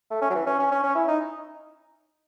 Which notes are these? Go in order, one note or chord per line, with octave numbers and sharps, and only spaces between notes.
A3
C#4
F#3
E3
C#4
C#4
C#4
C#4
E4
D#4